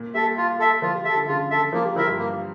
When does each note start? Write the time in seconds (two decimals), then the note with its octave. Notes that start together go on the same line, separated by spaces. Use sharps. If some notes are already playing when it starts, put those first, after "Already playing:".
Already playing: A#2
0.14 G3 A4 E5
0.37 F4
0.60 A4 E5
0.82 F3 F4
0.94 G3
1.05 G3 E5
1.09 A4
1.16 D3
1.28 C#3 F4
1.51 A4 E5
1.73 F3 A#3
1.85 G3
1.96 F3 E4 A#4 E5
2.08 G2
2.19 A#3